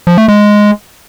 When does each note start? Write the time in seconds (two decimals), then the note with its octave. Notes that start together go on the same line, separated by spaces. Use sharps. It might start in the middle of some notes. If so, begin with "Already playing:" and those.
0.07 F3
0.18 A3
0.28 G#3